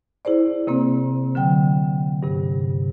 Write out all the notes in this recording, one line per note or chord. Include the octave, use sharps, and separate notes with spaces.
E4 G#4 C5 D5
C3 A#3 C4
D3 F#3 G5
G2 C3